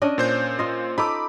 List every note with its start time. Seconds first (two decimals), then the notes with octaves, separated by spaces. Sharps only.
0.02 C#4 D4 D#5
0.18 A#2 C5 G6
0.59 F4 D#5
0.98 D#4 A4 B5 D6